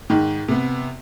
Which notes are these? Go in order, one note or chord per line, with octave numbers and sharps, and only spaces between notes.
G#2 D#3
C3 B3